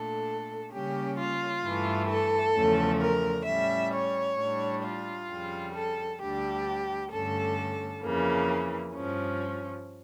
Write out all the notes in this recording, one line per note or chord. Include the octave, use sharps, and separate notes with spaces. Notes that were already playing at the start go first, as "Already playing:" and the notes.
Already playing: A#2 A3 D4 A4
C#3 G3 A#3 C#4 G4
F4
G2 E3 A3
A4
E2 C#3 F3 A3 C#4
A#4
A2 G3 C#4 E5
C#5
A2 G3 D4
F4
F2 C#3 G3
A4
D2 D3 G3 D4 G4
G2 D3 A3 C#4 A4
F2 C#3 E3 A#3
G2 F3 C#4